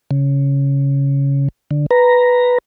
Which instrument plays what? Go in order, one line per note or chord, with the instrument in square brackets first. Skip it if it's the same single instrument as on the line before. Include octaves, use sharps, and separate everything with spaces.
[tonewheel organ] C#3
D3
B4 A#5